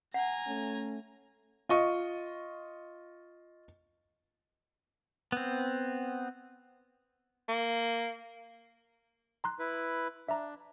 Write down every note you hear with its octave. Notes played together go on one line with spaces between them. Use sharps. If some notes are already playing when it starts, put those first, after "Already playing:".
F#5 G#5 A#5
A3 C#4
F4 D#5 C#6
B3 C4
A#3
A#5 C6 F#6
E4 B4
D4 E5 A#5